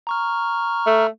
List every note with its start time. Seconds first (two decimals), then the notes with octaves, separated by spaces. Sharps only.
0.07 A#5 C#6 F6
0.86 A3